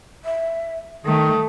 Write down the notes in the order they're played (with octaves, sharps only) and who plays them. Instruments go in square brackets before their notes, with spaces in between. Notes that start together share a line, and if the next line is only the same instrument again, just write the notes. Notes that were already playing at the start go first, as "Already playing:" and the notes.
[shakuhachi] E5
[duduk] D#3 [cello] A3 [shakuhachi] D#6